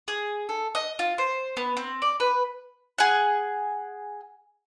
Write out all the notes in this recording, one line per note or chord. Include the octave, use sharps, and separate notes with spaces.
G#4
A4
D#5
F4
C5
B3
C4
D5
B4
G#4 F#5